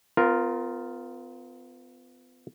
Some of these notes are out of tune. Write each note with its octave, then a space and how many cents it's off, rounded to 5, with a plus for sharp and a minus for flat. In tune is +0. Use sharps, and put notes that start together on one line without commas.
B3 +45 F4 +0 A#4 +0